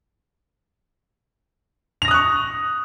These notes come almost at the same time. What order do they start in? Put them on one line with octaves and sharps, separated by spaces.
F7 A#6 D#6 F#6 C#6